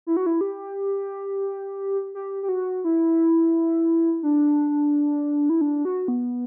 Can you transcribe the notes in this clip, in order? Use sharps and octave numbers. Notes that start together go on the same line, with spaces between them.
E4
F#4
E4
G4
G4
G4
F#4
E4
D4
E4
D4
F#4
B3